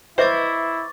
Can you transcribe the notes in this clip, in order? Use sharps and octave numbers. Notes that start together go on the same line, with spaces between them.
E4 B4 C5 D#5 E5 C#6 D6 A6